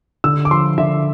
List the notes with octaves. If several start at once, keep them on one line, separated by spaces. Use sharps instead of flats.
D3 E6
D6
F3 C6
D3 E5